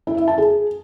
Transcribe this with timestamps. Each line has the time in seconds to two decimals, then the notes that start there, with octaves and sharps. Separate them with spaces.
0.07 E4
0.17 E5
0.28 A5
0.38 G#4